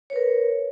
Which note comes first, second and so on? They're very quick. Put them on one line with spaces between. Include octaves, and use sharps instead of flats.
C#5 B4 A#4